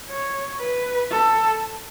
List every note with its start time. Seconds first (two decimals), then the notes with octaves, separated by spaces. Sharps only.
0.09 C#5
0.60 B4
1.11 A4